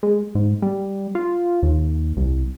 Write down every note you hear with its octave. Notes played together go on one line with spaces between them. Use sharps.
G#3
G#2
G3
F4
D#2
C2